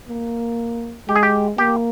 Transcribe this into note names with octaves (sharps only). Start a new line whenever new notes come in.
A#3
G#3 G4
G#4
G4
A#3 G4